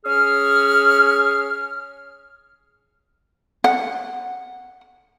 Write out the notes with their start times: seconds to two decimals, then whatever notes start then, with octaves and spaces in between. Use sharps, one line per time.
0.05 C#4 G#4 F6
3.64 F#5